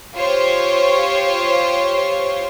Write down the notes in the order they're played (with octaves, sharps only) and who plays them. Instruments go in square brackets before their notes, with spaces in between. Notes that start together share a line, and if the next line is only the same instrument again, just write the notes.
[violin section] F4 G4 C5 C#5 C#6